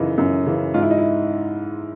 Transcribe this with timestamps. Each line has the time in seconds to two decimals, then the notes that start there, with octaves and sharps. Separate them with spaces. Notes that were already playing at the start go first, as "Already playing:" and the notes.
Already playing: F#2 C#3 E3 D#4
0.18 F#2
0.46 C#3 E3
0.74 G#2 F4
0.82 E4
0.90 D#4
0.98 E4